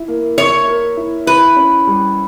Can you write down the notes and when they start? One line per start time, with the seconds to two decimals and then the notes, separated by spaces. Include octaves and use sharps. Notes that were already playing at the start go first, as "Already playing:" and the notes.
Already playing: E4
0.08 A#3
0.38 C#5 E5
0.68 A#4
0.97 E4
1.27 E4 B4
1.56 C#4
1.87 G3